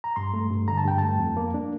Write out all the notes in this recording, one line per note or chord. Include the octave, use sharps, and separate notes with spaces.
A#5
G2 C6
A3
G2
D3 A#5
A5
G2 G5
A3 A5
F2
A#3
D4